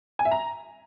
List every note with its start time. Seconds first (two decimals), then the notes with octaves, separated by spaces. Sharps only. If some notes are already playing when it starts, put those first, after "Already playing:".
0.19 G#5
0.25 E5
0.31 A#5